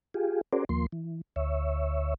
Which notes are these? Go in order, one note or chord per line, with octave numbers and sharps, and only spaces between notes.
F4 G4 G#4
C#4 F#4 G#4 A#4 C5 D5
D#2 F3 A#3 C6
E3
D2 C#5 E5